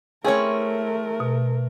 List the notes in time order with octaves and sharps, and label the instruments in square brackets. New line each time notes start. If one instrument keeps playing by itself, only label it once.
[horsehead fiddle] A3 A#4 [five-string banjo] C4 C#4 E4 [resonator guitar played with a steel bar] G#4 C#5
[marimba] B2